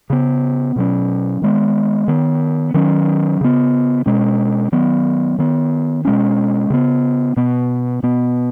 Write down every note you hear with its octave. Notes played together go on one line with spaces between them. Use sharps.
C#3 B3
B2 F#3 C#4
D#3 G#3 B3
D#3 B3
D#3 F#3 C#4
C#3 B3
B2 G#3 C#4
D#3 F#3 B3
D#3 B3
B2 G#3 C#4
C#3 B3
B2 B3
B2 B3